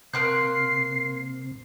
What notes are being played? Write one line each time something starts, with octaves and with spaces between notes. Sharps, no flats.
C3 A#3 C6 F#6 C7